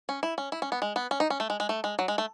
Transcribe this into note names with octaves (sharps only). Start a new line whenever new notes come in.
C#4
E4
C#4
E4
C#4
B3
G#3
B3
C#4
D#4
C#4
A3
G#3
G#3
A3
G#3
F#3
G#3
A3